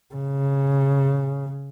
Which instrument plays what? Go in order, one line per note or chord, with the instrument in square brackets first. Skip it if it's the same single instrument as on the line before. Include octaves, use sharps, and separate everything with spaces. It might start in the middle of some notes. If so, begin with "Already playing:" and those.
[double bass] C#3